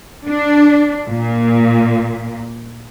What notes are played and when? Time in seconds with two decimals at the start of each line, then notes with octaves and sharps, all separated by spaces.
0.27 D4
1.08 A#2